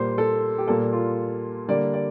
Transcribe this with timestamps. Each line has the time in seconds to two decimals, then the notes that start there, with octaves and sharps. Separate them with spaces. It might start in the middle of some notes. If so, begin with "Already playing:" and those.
Already playing: A#2 G3 A#3 C5
0.18 A4
0.58 G4
0.68 A#2 G3 A#3 A4
0.93 F4
1.68 D3 G3 A#3 D5
1.94 D5